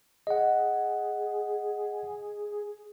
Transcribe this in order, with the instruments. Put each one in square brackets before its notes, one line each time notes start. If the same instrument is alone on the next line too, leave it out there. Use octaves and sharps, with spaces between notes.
[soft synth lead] G#4 [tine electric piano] D#5 F#5